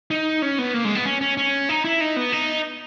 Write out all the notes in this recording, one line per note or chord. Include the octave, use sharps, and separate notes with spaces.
D#4
C#4
B3
A#3
G#3
B3
C#4
C#4
C#4
D#4
E4
D#4
B3
D#4